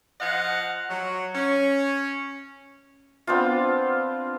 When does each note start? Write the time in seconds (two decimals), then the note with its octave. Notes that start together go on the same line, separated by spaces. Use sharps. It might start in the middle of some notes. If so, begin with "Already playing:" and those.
0.21 F3 D#5 F5 F#5
0.90 F#3
1.35 C#4
3.27 B3 C4 D4 F4